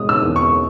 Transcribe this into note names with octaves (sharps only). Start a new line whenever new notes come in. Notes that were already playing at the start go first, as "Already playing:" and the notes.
Already playing: B2 G#3 D#6
E6
E2
C#6